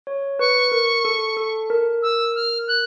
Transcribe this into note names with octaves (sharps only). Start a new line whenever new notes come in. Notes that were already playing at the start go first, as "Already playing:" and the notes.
C#5
B4 C#6
A#4
A4
A4
A#4
E6
F6
F#6